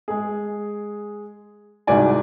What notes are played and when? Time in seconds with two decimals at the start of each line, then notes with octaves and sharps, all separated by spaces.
0.08 G#3 G#4
1.87 C2 G#2 F#4 D5 G#5